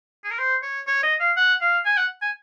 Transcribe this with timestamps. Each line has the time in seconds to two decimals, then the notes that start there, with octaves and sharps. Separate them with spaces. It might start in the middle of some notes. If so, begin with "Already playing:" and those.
0.24 G#4
0.31 A#4
0.38 C5
0.63 C#5
0.87 C#5
1.03 D#5
1.20 F5
1.36 F#5
1.61 F5
1.85 G#5
1.97 F#5
2.22 G#5